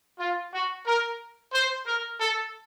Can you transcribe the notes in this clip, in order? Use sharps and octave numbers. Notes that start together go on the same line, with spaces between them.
F4
F#4
A#4
C5
A#4
A4